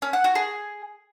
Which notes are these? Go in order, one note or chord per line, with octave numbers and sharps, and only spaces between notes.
C#4
F#5
F#4
G#4